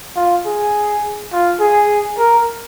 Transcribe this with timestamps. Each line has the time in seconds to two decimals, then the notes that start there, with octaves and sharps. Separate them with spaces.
0.16 F4
0.46 G#4
1.32 F4
1.60 G#4
2.18 A#4